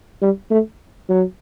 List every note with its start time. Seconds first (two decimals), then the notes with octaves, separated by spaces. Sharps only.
0.22 G3
0.51 A3
1.09 F#3